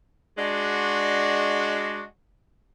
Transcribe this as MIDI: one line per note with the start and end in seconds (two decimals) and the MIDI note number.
0.38 2.03 56
0.38 2.03 62
0.38 2.03 66